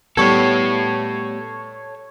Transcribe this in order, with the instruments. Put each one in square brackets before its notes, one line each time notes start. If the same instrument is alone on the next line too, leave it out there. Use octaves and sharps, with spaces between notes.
[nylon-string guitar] G3 A3 B3 [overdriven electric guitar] A4 C#5 [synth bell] C#6 G#6